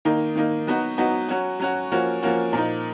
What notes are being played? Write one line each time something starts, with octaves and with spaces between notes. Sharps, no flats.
D#3 A#3 D#4
D#3 A#3 D#4
F#3 B3 D#4 F#4
F#3 B3 D#4 F#4
F#3 C#4 F#4
F#3 C#4 F#4
F3 A#3 C#4 F#4
F3 A#3 C#4 F#4
A#2 F3 A#3 D#4